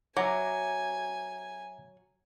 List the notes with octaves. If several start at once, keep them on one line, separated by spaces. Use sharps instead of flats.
F#3 E5 G#5 A#5 D6